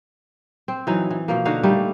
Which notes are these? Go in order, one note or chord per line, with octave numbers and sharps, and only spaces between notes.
C4
E3 F#3 D#4
E3
B2 F3 A#3
D3 D#4 F#4 F5
G3 A3 A#3 D#4